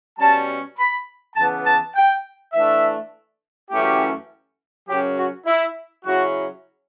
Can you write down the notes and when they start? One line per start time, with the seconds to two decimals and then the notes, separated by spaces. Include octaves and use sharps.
0.19 B2 G3 C#4 A5
0.77 B5
1.36 C#3 E3 B3 A5
1.66 A5
1.95 G5
2.53 E3 A3 D4 E5
3.70 F#2 E3 A3 C#4 E4 G4
4.88 F#2 C#3 F#3 C#4 G4
5.17 F#4
5.46 E4
6.05 C#3 F#3 C#4 E4 F#4